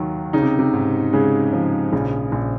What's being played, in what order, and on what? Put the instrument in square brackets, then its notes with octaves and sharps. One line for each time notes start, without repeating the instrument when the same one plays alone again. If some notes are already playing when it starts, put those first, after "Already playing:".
Already playing: [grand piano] D#2 D#3 F#3
[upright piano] C#3 [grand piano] D#4
[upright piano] C3
C3
[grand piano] G#2
[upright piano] C#3 [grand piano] G#3
[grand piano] F3
[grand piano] A#1 [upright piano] C#3
[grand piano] A#1